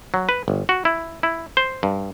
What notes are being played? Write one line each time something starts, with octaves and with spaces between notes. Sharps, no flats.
F#3
B4
G1
F#4
E4
E4
C5
G2